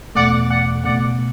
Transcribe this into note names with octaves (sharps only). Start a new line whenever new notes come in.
E2 B2 A3 D5 F#5
D5 F#5
C#2 B2 A3 D5 F#5